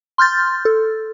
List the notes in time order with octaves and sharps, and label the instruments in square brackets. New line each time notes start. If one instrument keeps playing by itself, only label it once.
[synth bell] C6 F6 G6 A6
A4